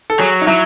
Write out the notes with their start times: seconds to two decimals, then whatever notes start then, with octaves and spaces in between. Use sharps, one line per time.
0.10 A4
0.19 F#3 G#4
0.41 D#4
0.47 F#3 E4